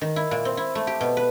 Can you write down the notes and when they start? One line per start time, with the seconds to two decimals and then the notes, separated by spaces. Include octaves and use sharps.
0.01 D#3
0.16 E4
0.31 A#2
0.45 C4
0.57 E4
0.75 A3
0.87 G4
1.01 B2
1.17 B4